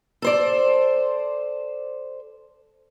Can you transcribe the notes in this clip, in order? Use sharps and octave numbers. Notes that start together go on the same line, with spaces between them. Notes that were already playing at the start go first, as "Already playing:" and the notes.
A4 C5 D5